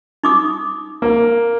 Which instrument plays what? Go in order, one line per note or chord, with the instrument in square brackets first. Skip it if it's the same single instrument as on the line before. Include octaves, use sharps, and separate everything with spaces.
[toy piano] D#4 D6 D#6
[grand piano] A#3